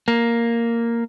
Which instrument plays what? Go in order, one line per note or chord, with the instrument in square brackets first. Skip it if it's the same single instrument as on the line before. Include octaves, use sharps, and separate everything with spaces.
[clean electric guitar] A#3